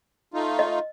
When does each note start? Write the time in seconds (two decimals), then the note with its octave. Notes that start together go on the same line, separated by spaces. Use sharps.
0.34 A3 D#4 F4
0.59 D#5